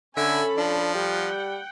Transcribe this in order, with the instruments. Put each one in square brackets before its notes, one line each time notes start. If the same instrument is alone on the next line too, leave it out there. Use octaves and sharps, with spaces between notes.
[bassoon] D3 [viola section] C#4 A4 B5 [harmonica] E5 G#5
[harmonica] F3 [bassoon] D4
[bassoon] G3 [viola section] F#5 G5